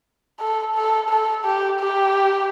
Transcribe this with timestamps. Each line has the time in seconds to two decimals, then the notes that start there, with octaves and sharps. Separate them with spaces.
0.40 A4
0.75 A4
1.10 A4
1.45 G4
1.80 G4